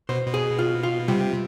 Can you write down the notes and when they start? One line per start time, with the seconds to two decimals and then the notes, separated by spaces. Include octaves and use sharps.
0.09 B2 C5
0.26 B2
0.34 G#4
0.59 F4
0.83 F4
1.08 C3 G3